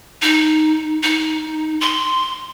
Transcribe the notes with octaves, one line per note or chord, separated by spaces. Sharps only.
D#4
D#4
C6